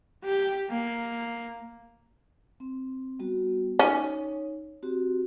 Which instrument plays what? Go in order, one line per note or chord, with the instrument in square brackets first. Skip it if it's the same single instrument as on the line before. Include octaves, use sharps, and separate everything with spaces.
[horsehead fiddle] G4
A#3
[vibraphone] C4
G3 B3 F#4
[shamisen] C#4 [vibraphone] D#4 C#5
[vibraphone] C4 F#4 G4